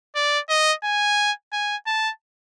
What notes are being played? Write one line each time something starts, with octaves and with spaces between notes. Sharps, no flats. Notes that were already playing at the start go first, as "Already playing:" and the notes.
D5
D#5
G#5
G#5
A5